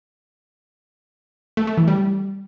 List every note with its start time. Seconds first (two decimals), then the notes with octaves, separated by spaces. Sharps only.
1.57 A3
1.67 A3
1.77 E3
1.88 G3